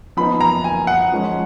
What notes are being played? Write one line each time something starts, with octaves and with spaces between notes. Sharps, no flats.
F3 B3 D#4 B5
A#5
G#5
F#5
F3 G#3 C#4